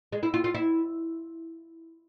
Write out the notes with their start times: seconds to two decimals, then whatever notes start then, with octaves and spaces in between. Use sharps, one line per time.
0.12 G#3
0.23 E4
0.34 F4
0.44 F4
0.54 E4